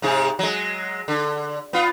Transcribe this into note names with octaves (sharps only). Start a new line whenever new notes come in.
G#2 C3 G#4
F#3 G#3
D3
B3 F4